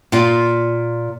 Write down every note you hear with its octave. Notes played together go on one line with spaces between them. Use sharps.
A#2 F4